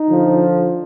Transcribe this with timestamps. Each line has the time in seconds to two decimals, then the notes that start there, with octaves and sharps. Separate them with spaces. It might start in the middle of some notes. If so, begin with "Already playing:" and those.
Already playing: D#4
0.09 D3 F3